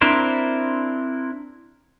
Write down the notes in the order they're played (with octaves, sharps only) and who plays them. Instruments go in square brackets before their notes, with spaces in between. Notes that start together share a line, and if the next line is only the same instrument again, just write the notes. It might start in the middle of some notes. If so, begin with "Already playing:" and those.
[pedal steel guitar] C4 D4 E4 A#4 C5